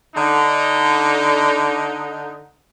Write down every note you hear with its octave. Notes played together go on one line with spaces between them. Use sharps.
D3 D#4